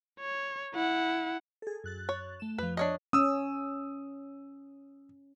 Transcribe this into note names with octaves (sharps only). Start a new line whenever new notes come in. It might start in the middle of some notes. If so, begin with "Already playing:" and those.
C#5
E4 F#5
G#4 A4
F#2 F#6 A6
C#5
A3 E7
F2 F3 B4
D4 C#5 D#5
C#4 D#6 E6